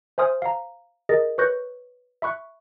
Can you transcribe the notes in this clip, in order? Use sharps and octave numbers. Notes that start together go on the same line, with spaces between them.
C5 E5 G#5 C6 D#6 F6
F5 A#5
G#4 A#4 D#5 A6 A#6
B4 C#5 C#6 F#6 G6 A#6
E5 B5 C#6 F#6